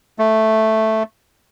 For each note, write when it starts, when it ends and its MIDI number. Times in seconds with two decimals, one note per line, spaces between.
0.19 1.03 57